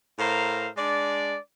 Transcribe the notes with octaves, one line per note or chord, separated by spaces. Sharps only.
A2 A#4 C5 F5 A#5
G#3 D4 D5